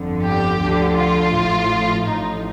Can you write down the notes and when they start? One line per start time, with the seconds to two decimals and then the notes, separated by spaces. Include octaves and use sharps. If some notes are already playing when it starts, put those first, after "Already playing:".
Already playing: G1 F2 D3 F3
0.23 G4
0.59 D2 D3 F3
0.96 F4
1.33 A1 A2 F3
2.06 A1 A2 F3 D#4